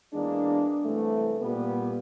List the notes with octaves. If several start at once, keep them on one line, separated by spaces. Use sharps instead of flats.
E2 G#3 A#3 D4
C2 E3 A3
A#2 G3 B3